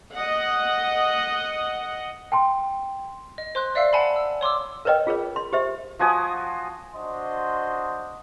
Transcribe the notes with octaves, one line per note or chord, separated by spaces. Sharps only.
D#5 F#5
G5 A5 C6
D#5
C5 C6 F#6
D5 E5 F5 E6 C7
F#5 G#5 A5 B5
E6
C#5 C6 D6 E6
A#4 B4 C#5 D#5 G5
F4 G#4 A#4 C#5
C6
G4 C5 E5
F3 F#4 G#5 D#6
D4 F#4 C5 D#5 C6